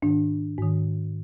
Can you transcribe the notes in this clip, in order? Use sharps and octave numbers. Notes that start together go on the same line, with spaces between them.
G#2 D#3 D4
G#2 D#3